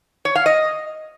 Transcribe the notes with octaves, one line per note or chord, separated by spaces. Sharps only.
C#5
F5
D#5